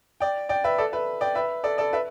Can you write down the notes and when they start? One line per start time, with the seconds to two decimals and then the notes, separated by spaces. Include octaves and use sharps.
0.20 D5 G5
0.49 D5 G5
0.64 B4 E5
0.78 A4 D5
0.92 B4 E5
1.21 D5 G5
1.35 B4 E5
1.64 A4 D5
1.78 A4 D5
1.93 B4 E5